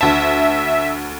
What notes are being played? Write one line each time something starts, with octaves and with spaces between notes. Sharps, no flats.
D2 E5 A5